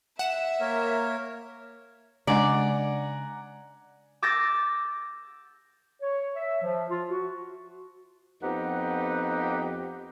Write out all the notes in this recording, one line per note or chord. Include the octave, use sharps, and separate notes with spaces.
E5 F#5 E7
A#3 A#4 C#5
C#3 G#3 D4 D5 D#5 F#5 G#5 A#5
D6 E6 G6 A6 A#6
C#5
E5
F3
F4
F#4
F2 B3 C4 D#4 G4 F#5